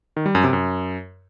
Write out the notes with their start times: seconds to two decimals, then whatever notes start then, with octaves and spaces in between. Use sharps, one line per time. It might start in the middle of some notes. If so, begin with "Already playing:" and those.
0.17 D#3
0.26 G3
0.35 F#2
0.44 C3
0.53 F#2